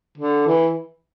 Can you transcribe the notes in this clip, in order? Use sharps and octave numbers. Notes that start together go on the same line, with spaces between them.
D3
E3